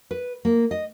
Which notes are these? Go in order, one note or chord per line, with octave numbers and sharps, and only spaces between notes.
B4
A#3
D#5